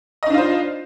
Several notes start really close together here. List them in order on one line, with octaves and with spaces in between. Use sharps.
D#5 D#4 D4 F4 C5